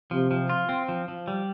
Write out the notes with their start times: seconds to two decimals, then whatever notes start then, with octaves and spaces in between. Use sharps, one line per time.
0.11 C3 F3
0.31 F3
0.50 F4
0.69 C4
0.88 F3
1.08 F3
1.28 G3